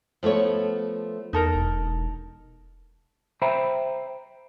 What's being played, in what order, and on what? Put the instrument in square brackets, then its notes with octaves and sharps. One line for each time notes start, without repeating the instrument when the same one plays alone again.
[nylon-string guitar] F3 A3 B3 C#5
[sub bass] E2 [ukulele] D#4 A4 A#4
[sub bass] E1
[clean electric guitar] C5 E5 G5 A#5 B5